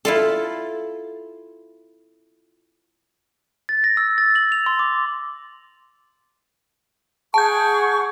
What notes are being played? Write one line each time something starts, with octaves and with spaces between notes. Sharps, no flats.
E4 F4 A4
A6
A#6
E6
A6
F#7
F7
C6
D6
G#4 F#5 A5 C#6 G6